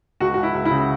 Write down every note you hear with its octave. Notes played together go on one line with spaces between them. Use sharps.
C#2 F#4
C#2 F#4
E4
C#2
E4
C#3